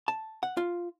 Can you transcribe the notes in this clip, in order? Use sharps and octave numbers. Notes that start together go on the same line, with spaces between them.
A5
F#5
F4